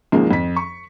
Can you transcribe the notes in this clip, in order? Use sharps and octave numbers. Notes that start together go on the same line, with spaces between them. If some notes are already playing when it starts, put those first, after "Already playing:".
B1 F#2 F3 G#3 A#3
F2 B6
C#6